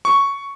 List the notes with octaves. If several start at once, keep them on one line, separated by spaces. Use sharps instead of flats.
C#6